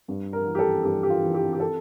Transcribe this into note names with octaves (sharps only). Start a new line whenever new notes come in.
G2
A#4
E3
G4
A4
G2 G4
G4
F4
E3
G4
G4
A4